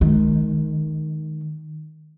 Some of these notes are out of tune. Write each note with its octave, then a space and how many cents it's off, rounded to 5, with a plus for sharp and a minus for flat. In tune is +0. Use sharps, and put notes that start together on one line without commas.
D#3 +0 G#3 +30